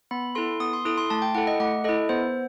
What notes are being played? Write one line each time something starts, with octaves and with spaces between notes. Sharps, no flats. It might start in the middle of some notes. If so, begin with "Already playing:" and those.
B3 B5
E4 A4 C6
B3 D#6
C6
E4 A4 D#6
C6
A3 A5
G5
E4 A4 F#5
D#5
A3 F#5
E4 A4 D#5
B3 C5